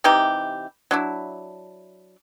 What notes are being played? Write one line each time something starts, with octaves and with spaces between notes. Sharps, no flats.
C3 E3 D#4 G4
F#3 D4 E4